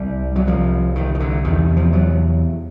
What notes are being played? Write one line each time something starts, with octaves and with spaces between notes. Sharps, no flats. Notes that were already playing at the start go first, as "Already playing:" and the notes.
Already playing: C2 C3 G3
F#3
C2 C3 F3
D#3
D#3
D3
E2 C3 D#3
F3
F#3